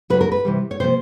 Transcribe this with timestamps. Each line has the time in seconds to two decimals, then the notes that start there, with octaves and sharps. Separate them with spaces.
0.10 D2 C#3 F#3 B4
0.21 A#4
0.32 B4
0.45 C3 E3 G3
0.71 C#5
0.80 C3 F3 A#3 C5